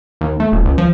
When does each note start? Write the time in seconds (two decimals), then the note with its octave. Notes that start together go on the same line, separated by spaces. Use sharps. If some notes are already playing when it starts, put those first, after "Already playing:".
0.21 D#2
0.40 A3
0.52 D#1
0.65 C#2
0.78 F3